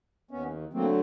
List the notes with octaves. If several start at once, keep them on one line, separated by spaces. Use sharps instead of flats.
D#2 B3 C#4
D3 F#3 A3 A#3 C4